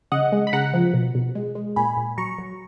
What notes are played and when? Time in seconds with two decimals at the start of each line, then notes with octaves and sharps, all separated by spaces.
0.12 C#3 D#5 F#5
0.32 G#3
0.47 B5
0.53 C#3 F#5 A#5
0.73 F3
0.94 B2
1.15 B2
1.35 G#3
1.55 G#3
1.76 A#2 G#5 B5
1.97 A#2
2.18 F#3 A#5 C#6
2.38 F#3